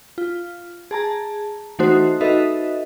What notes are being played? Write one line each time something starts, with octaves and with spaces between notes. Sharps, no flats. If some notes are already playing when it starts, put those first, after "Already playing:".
F4
G#4 A5 A#5
E3 A3 D#4 F#4 C5
D#4 F#4 A4 B4 D#5 E5